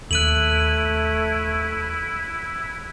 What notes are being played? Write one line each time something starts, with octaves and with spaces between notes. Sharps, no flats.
D#2 A3 E4 F#6 D#7 F#7